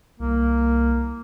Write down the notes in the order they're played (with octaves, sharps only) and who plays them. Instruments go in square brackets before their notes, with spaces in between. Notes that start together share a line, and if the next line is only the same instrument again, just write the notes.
[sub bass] C2 [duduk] A#3